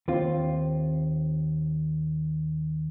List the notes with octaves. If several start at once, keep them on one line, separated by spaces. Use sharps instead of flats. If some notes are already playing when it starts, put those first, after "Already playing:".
D#2 C4 F4